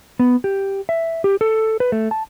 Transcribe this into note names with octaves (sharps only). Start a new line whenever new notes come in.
B3
G4
E5
G4
A4
B4
A3
A5